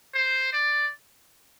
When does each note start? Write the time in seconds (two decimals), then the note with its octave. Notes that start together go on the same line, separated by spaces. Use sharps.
0.14 C5
0.53 D5